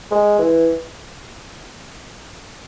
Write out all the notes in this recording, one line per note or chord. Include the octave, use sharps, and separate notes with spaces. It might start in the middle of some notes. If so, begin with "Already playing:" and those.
G#3
E3